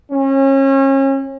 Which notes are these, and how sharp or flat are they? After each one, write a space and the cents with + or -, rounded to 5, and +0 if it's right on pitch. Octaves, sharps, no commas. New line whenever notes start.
C#4 -35